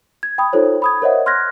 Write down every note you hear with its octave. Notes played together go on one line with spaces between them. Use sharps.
G#6
G5 B5 D#6
D#4 F4 A4 C5 C#5
B5 D#6 G#6
A#4 C5 C#5 D#5 E5 F#5
C6 F6 F#6 G#6 A#6